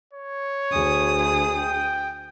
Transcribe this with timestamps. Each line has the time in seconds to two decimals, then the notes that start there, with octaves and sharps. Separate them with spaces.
0.13 C#5
0.71 D2 G#4 D#6
1.57 G5